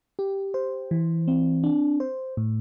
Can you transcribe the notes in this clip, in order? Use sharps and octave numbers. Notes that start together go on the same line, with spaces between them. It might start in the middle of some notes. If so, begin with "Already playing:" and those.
G4
C5
E3
C4
D4
C5
A2